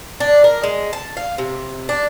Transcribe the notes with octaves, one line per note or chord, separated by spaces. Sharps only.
D4
A#4
G#3
A5
F5
C3
D4